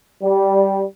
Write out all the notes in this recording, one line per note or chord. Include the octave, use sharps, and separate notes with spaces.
G3